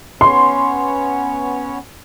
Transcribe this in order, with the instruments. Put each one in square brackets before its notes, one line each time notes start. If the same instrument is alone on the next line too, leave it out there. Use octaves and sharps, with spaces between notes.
[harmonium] B3 C#4 C#5 [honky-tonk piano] C6